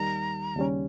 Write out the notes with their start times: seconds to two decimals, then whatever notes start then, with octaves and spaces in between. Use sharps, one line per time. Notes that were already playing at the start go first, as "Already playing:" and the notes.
Already playing: D#2 D#3 G3 A#5
0.56 D#2 C#3 G3 C#4